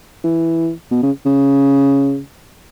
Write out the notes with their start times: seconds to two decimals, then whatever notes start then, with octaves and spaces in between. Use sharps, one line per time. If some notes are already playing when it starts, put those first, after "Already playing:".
0.24 E3
0.91 B2
1.03 C#3
1.25 C#3